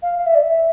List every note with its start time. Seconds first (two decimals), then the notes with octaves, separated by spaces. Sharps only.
0.02 F5
0.19 F5
0.26 E5
0.35 D5
0.43 E5